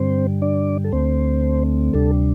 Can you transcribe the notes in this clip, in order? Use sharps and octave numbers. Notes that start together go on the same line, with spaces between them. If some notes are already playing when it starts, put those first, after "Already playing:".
Already playing: G2 D3 G3 C4 C5
D4 D5
A4
D2 D3 A3 C4 C5
D2 C3 G3 D4 A4